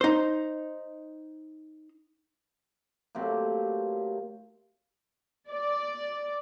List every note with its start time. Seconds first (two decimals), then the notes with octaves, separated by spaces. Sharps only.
0.01 D#4 C5
3.15 A2 C3 F#3 A#3
5.50 D5